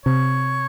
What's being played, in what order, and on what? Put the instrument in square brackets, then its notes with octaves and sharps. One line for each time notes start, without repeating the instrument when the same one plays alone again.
[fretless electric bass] C3 [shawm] C#5